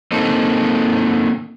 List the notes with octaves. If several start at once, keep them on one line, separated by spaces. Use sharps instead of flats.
A#3 C4 D#4 A4